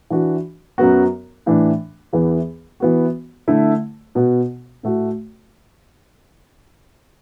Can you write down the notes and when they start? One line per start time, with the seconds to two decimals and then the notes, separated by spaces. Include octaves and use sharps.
0.10 E3 D4 F#4
0.78 F#2 F#3 B3 F#4
1.46 A2 E3 D4
2.13 E2 E3 B3 E4
2.80 E3 B3 F#4
3.48 D3 A3 E4
4.15 B2 B3 F#4
4.83 A2 A3 F#4